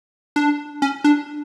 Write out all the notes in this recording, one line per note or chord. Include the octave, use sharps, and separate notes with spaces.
D4
C#4
D4